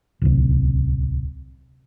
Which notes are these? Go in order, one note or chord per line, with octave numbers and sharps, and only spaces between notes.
D1 C2